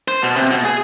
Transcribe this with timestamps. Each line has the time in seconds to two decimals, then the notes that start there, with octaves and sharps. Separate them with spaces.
0.08 C5
0.22 B2
0.36 C3
0.51 B2
0.65 G#4